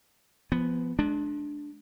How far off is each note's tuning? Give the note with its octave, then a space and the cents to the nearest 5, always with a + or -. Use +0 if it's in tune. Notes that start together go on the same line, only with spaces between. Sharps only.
F3 -20 B3 +0
G#3 +40 D4 +0